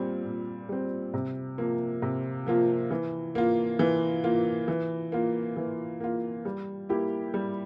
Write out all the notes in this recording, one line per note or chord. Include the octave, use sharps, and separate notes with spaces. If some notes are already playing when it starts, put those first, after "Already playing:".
Already playing: A#2 G3 C4
A#2
G3 C4
C3
F3 A#3 F4
C3
F3 A#3 F4
E3
A#3 F4
E3
A#3 F4
E3
A#3 F4
E3
A#3 F4
G3
A#3 E4 G4
G3